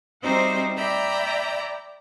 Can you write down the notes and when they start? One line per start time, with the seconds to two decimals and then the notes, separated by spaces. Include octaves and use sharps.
0.23 G3 C4 D#4 F#4 C5 E5
0.77 D5 E5 G5 A#5 B5